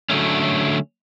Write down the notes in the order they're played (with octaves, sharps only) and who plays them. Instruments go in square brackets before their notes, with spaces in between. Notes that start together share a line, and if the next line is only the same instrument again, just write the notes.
[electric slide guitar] D3 F#3 A3 C#4